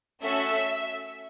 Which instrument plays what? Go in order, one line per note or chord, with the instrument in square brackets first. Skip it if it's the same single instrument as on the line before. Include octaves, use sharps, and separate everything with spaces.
[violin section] A3 C#4 F#4 A4 E5